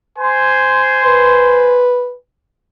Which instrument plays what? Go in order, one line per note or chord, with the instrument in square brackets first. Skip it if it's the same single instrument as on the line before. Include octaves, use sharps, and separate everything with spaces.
[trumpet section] C5 G#5 C6
[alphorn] B4